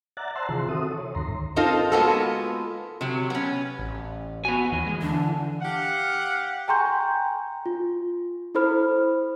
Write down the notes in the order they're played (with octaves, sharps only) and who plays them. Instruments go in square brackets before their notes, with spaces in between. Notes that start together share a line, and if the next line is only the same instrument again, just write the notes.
[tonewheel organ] D5 E5 F#5 A#5 F#6 A6
C5 A5 A#5 C6 E6 F#6
C3 D#3 E3 F4 G#4 C6
C4 F#4 A4 E5 D#6
C#5
D2 G2 D#3 A#5 C6
[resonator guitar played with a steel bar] C4 D#4 F4 A4 A#4 C5
G#3 A#3 B3 F4 F#4 A4
C3 F#3
B3 C#4
[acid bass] A1
[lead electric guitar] B3 G#5 [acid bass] F#4
[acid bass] D#2 [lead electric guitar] E3
[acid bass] G#3
[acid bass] D3 [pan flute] D4
[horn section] G4 F5 F#5
[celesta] G5 G#5 A#5 C6 C#6 G6
F4
E4 A4 C5 B5 F6